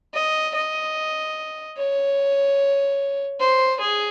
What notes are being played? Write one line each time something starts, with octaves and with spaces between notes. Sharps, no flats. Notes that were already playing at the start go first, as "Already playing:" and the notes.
D#5
D#5
C#5
C5
G#4